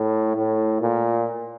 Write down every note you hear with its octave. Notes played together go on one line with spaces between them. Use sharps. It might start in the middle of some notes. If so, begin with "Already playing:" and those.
Already playing: A2
A2
A#2